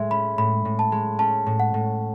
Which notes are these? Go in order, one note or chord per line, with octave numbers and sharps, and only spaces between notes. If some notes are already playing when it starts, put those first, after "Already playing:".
Already playing: A2 G#3 E5
C#4 B5
A2 B5
A2
A5
G#3
C#4 A5
A2
F#5
A2